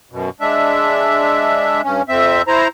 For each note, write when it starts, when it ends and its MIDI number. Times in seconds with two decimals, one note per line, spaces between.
0.11 0.30 42
0.11 0.30 47
0.40 1.81 56
0.40 1.81 62
0.40 1.81 76
1.84 2.02 43
1.84 2.02 61
2.09 2.42 41
2.09 2.42 60
2.09 2.42 76
2.48 2.68 64
2.48 2.68 72
2.48 2.68 82